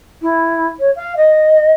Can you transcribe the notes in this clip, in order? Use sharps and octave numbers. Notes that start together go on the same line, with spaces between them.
E4
C#5
F5
D#5